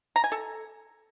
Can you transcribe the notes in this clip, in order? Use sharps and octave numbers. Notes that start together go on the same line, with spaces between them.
A#5
G#5
A4